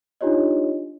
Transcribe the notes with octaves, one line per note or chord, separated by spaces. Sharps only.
D4 D#4 F4 G4 C#5 D#5